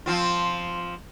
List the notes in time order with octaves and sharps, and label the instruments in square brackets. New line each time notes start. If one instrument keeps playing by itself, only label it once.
[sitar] F3 C4 F4